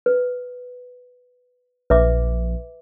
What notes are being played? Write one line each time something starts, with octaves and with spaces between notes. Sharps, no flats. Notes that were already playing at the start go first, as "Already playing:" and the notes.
B4
A#1 B4 E5 D6